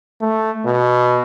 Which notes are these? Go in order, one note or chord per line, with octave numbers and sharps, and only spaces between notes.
A3
B2